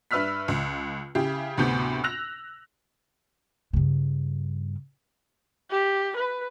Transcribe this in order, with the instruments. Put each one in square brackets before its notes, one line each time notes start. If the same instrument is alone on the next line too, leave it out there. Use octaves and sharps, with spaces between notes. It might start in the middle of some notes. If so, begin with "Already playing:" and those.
[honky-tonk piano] G2 B4 E5 E6 F6 B6
C#2
C#3 E4 G4
D2 A2 C3 B3 G6
E6 F#6 A#6 F7
[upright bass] G2 C#3
[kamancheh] G4
B4